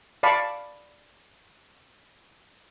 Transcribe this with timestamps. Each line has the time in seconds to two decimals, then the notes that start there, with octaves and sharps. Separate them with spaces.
0.23 D5 F5 A5 B5 C#6